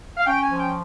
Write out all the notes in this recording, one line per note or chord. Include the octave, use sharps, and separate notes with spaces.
F5
C#4 G5
G#5
F3
G5